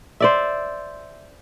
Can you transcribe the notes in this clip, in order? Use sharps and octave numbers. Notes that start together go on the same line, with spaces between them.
C5 D5 E5